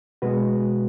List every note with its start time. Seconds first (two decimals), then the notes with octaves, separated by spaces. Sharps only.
0.22 B2 G#3 B3 F#4 B4